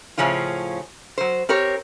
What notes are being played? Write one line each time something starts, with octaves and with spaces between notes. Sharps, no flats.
A2 C#3 F3 C#4 F4
F#3 C5
C4 G4 A#4 C#5